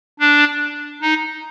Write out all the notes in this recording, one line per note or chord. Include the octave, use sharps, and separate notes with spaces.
D4
D#4